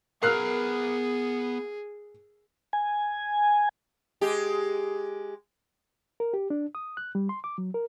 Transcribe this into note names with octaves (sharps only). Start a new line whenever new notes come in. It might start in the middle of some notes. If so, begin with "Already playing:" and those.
B3 G#4 A#4 A#5 F6 F#6 C7
G#5
G#3 G4
A#4
G4
D4
D#6
F#6
G3
C6
D6
F#3
A#4